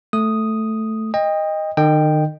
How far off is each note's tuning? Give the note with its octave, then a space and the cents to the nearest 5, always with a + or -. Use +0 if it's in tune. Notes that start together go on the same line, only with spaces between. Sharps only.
A3 +0 D#6 +0
D#5 +0 G5 +30
D#3 -40 D#5 -20 G5 +0